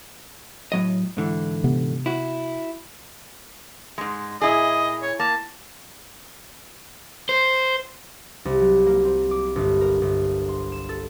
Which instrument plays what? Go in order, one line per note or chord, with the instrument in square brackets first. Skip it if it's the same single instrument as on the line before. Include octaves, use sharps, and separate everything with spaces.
[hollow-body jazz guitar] A2 F#3 D#5
G#2 D3 E3
[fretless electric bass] C3 B3
[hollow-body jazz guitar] E4 F#4
[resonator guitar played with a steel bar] G#2 G#3
[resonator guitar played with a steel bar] A#2 E4 G#4 [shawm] D#5
[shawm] C#5
[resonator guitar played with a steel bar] A#3 [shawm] A5
[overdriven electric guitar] C5
[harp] C2
F#3
A#3
C4
D6
G1
A#4
G1
C6
E7
A4